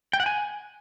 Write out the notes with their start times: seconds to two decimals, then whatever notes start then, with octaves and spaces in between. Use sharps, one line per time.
0.13 G5
0.20 F#5
0.26 G#5